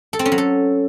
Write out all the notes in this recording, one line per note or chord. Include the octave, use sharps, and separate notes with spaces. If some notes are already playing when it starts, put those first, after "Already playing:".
A4
C4
C#4
F#3
A4